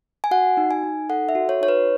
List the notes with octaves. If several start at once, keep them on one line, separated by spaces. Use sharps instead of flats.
G#5
F#4 F#5
D#4
G#5
D#4
A4 F#5
E5
F#4
C#5
D#4 C#5
B4